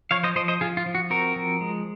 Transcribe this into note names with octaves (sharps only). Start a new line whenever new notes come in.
F3 C#5 F5
C5 D#5
F3 C5 D#5
C5 D#5
F3 F4 G#4
F4
F3
F#4
C4 F#4 A#4
F3
G#3